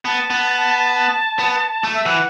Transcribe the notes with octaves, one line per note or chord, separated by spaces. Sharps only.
B3 A5
B3
B3
A3
E5
E3 F#5